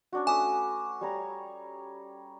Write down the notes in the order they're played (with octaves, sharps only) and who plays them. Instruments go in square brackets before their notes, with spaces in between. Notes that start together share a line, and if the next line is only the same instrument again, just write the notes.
[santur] C#4 D4 F#4
[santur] A3 B4 D#6 [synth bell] G#5 D6
[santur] G3 C#5 A#5